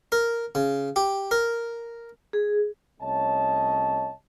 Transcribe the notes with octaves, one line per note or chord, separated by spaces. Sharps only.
A#4
C#3
G4
A#4
G#4
C2 A3 C#4 C#5 D#5 A5